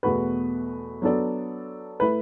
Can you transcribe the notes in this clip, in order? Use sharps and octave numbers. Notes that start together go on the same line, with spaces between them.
E2 B2 A3 F#4 B4
F#3 B3 D4 A4 D5
A3 E4 B4